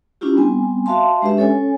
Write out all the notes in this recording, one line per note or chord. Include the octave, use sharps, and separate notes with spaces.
C#4 D4 E4 F4 G4
G3 B3 C4 G#5
F#4 E5 F5 A5 C6
G#3 D4 G4 B4 E5
C#4 A4 C#5 G#5